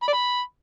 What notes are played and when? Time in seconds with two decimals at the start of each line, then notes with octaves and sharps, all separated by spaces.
0.02 B5
0.08 D5
0.13 B5